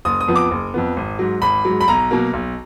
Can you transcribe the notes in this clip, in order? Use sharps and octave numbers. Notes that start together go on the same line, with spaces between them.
F#1 D#6
D#6
F2 F3 B3
D6
F#1
F2 F3 B3
G#1
G#2 F#3
G#1 B5
G#2 F#3
B5
B1 A#5
B2 F#3 A#3
B1